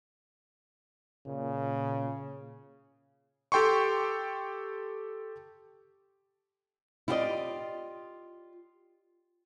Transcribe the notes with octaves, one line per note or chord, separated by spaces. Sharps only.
A#2 C#3
G4 A4 G5 C6 C#6
E4 F4 G4 A4 D5 D#5